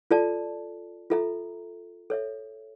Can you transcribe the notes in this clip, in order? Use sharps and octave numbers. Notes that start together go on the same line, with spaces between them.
F4 A4 D5 A5
F4 A4 E5 A#5
A4 C#5 E5